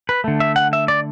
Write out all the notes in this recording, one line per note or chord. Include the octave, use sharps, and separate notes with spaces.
B4
D3 A3
E5
F#5
E5
D5